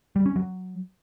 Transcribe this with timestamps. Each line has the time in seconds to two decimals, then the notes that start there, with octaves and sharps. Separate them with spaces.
0.16 G3
0.26 C#4
0.36 F#3